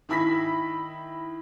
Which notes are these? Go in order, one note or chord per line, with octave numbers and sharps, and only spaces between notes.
D#3 E4 B5 A#6 B6